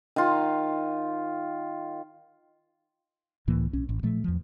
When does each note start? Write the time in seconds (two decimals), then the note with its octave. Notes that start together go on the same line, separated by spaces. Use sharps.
0.16 D#3 F4
3.47 C#2 A2 E3 A#3
3.73 B1 C#4
3.89 A1
4.03 A#2 F3 A3
4.24 E2 F3